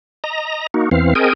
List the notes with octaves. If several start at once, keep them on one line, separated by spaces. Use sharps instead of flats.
D#5 A#5
A#3 D#4 F#4
E2 E3 C4 F5
C4 G#4 A#4 D#5 G5 G#5